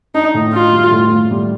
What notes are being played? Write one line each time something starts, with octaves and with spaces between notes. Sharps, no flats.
D4 D#4
A2
D4 F4
G3
A2
A2
G3